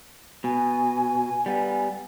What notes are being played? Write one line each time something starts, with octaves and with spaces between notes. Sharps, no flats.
B2 G#5
G3 B3